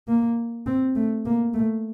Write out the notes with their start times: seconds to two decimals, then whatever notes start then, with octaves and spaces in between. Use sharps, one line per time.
0.08 A#3
0.67 C4
0.96 A3
1.25 A#3
1.54 A3